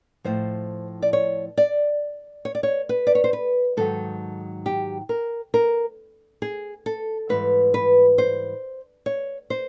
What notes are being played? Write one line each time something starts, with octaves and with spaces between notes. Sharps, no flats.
A2 F3 C5
D5
C#5
D5
C#5
D5
C#5
B4
D5
C#5
C5
B4
G#2 D#3 F#3 A4
G4
A#4
A#4
G#4
A4
G#2 E3 G3 B4
B4
C5
C#5
C5